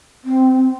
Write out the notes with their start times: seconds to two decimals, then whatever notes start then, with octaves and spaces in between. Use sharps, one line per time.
0.24 C4